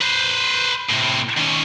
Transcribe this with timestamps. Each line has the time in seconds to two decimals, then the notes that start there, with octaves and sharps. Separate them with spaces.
0.01 B4 C5
0.90 A2 C3
1.38 D#3 C#4